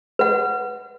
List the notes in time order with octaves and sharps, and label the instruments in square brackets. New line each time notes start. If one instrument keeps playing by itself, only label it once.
[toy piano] B4 F#5